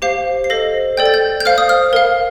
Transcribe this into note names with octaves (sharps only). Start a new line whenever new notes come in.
G4 C5 F5 C7
C7
A4 C5 D#5 A#6
A4 D5 G5 G6
A6
G6
G6
C5 F5 F6
D#6
F6
A#4 F5